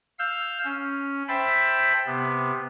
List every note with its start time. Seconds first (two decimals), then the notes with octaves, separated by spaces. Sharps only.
0.19 F5 E6 G6
0.65 C#4
1.28 C5 E5 G5 A5 B5
2.06 C3 B3